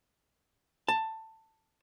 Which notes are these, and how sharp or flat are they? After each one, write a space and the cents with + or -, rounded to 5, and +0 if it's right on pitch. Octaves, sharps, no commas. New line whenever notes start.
A5 +15